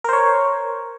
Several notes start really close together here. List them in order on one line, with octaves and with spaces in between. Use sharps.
A#4 C5 C#5